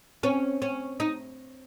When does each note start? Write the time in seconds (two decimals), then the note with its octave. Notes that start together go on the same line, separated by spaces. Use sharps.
0.23 C4 C#4
0.62 C#4
1.00 D#4